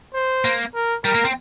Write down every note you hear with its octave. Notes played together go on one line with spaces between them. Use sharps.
C5
A#3
A#4
G3 A#4
A#3
C4